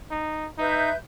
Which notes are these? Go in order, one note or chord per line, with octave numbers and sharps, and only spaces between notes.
D#4
D#4 B4 E5 G6